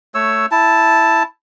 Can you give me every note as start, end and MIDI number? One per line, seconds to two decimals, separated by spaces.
0.15 0.46 57
0.15 0.46 73
0.15 0.46 88
0.51 1.23 64
0.51 1.23 81